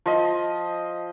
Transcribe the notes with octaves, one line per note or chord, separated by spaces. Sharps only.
F3 D#5